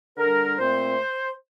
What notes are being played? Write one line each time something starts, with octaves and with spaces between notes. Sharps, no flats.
D3 G3 D4 A#4
A#2 A3 C4 C5